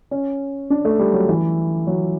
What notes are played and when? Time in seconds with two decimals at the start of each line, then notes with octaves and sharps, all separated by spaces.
0.11 C#4
0.70 D4
0.85 A3
0.99 G3
1.14 F#3
1.29 E3
1.87 F#3